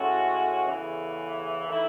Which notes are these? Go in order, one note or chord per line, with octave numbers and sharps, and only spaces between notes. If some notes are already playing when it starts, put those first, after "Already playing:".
Already playing: A2 G#3 C#4 F#4 A4
E2 C#3 E3 A3
D#3 A3 E4